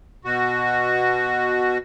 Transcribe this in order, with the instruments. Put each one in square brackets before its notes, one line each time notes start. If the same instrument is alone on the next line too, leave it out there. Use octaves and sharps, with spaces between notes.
[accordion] B2 F#4